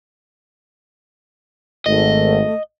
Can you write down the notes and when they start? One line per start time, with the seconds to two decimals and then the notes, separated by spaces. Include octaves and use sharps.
1.86 G#1 A3 D#5